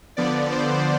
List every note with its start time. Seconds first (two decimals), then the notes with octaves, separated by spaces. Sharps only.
0.17 D3 F3 B3 D5
0.52 C5